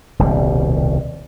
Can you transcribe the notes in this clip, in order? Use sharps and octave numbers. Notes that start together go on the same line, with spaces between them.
D#1 C2 B2 G3